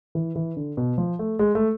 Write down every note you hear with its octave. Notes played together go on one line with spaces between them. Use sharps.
E3
E3
D3
B2
F3
A3
G#3
A3